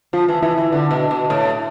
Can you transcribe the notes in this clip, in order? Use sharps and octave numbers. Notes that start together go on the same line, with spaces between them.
F3 F4
E3
E3 E4
E3
D3
B2
B2
A2